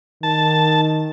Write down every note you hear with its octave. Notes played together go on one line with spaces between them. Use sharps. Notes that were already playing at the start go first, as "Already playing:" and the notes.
D#3 A5